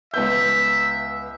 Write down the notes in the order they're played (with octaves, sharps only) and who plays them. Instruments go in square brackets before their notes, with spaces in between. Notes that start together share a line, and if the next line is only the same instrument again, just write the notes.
[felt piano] C#2 B3 G6 [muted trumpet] E5